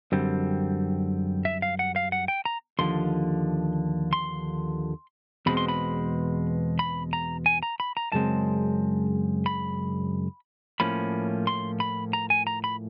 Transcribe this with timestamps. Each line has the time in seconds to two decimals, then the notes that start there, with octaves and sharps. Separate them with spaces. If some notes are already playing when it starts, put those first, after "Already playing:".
0.12 F#2 D3 G3 C4
1.45 E5
1.62 F5
1.79 F#5
1.96 F5
2.12 F#5
2.28 G5
2.45 A#5
2.79 D#2 D3 F3 C6
4.13 C6
5.46 E2 B2 G#3 C4 B5
5.57 C6
5.68 B5
6.79 B5
7.13 A#5
7.46 G#5
7.63 A#5
7.80 B5
7.97 A#5
8.12 F#2 C#3 G#3 C4 A5
9.46 B5
10.80 A2 F3 A#3 C#4 B5
11.47 C6
11.80 B5
12.13 A#5
12.30 G#5
12.47 A#5
12.64 B5